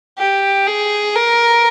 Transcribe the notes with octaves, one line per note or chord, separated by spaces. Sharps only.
G4
G#4
A#4